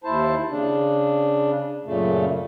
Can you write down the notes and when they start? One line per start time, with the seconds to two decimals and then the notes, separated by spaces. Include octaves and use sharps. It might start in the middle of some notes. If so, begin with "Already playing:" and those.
0.04 D#2 E4 C5 A5
0.49 C#3 D4
1.85 F#2 A#2 C#3 A3